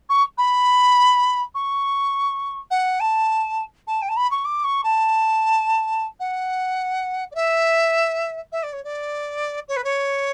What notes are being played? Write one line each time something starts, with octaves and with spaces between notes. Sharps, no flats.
C#6
B5
C#6
F#5
A5
A5
G5
A5
B5
C#6
D6
C#6
A5
F#5
D5
E5
E5
D5
C#5
D5
C#5
B4
C#5